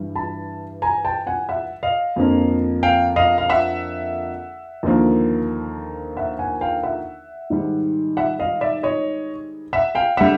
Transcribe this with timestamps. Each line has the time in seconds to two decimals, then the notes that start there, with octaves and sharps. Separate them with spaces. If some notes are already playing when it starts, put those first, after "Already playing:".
Already playing: G2 E3 G3
0.16 A5 B5
0.82 G#5 A#5
1.05 G5 A5
1.27 F#5 G#5
1.49 E5 F#5
1.83 D#5 F5
2.16 F2 D3 F3 A#3
2.83 F5 G5
3.16 D#5 F5
3.38 F5
3.49 E5 F#5
4.83 D#2 D3 F3 A#3
6.17 E5 F#5
6.39 F#5 G#5
6.61 F5 G5
6.83 E5 F#5
7.50 G#2 D#3 G3
8.17 E5 F#5
8.39 D#5 F5
8.61 D5 E5
8.83 C#5 D#5
9.73 E5 F#5
9.95 F5 G5
10.17 D3 G3 E5 F#5